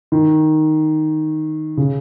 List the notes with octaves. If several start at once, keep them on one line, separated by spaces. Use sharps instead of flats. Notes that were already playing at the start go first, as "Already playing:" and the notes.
D#3
C#3